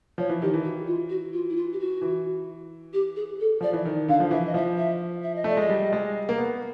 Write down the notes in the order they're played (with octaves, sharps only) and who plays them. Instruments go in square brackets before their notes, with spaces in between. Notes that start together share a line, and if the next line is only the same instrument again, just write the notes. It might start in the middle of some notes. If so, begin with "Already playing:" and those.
[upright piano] F3 [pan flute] C#5
[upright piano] E3
[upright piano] D#3 [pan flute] G4
[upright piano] E3
[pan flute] F#4
F4
F#4
F4
E4
F4
G4
F#4
[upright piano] E3
[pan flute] G4
G#4
A4
[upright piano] F3 [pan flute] D5
[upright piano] E3
D#3
[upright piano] D3 [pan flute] F5
[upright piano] F3
[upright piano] E3 [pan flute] E5
[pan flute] D#5
[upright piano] F3 [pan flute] E5
[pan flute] E5
E5
D#5
[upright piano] A3 [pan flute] D5
[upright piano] G#3 [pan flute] D#5
[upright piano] G3
G#3
A#3
B3